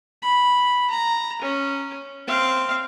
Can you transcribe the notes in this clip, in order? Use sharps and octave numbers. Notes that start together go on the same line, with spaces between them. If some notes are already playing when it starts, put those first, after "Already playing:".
B5
A#5
C#4
C4 F5